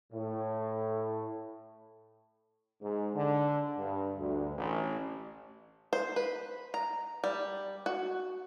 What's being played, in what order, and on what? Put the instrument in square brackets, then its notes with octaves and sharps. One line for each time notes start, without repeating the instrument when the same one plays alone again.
[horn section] A2
[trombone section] G#2
D3
G2
D2
A1
[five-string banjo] C5
B4
A#5
G3
F#4